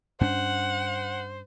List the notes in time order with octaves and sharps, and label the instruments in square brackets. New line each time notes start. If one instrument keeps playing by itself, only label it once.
[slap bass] G2 C#4 D4 [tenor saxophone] C5 [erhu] F#5